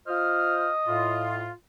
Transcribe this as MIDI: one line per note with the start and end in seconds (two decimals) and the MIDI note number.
0.07 0.70 65
0.07 0.70 72
0.07 1.43 75
0.07 0.70 89
0.87 1.50 45
0.87 1.50 65